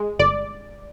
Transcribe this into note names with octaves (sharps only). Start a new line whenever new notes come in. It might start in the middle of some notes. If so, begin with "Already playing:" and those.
Already playing: G#3
G1 D5